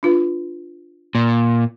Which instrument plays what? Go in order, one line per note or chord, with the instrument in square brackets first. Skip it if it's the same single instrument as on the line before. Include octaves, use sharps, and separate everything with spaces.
[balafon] D4 F4 B4
[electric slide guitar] A#2